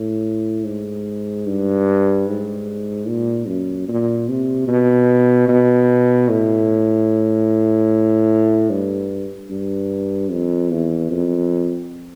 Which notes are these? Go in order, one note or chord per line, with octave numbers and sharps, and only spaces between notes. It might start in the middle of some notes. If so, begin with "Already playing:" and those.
Already playing: A2
G#2
G2
G#2
A#2
F#2
A#2
C3
B2
B2
A2
G2
G2
F2
E2
F2